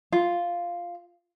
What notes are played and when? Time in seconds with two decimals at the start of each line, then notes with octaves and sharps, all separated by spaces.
0.12 F4